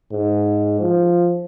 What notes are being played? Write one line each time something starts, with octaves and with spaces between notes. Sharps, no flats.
G#2
F3